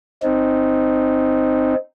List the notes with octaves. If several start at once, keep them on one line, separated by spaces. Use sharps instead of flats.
C4 D#4